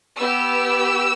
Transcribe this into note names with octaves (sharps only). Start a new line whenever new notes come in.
B3 G4 E6